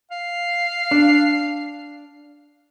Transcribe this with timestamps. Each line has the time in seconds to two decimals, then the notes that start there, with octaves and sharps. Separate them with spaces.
0.11 F5
0.91 D4